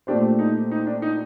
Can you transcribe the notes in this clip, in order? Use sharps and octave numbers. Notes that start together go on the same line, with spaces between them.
A#2 A3 C4 D4 G4 C5
D#4
D#4
D4
D#4